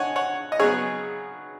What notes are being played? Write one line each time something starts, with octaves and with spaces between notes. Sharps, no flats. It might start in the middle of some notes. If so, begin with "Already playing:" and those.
Already playing: C#5 D#5 F#5 G#5
C#5 F#5
D#5
C#3 F#3 B3 G#4 C#5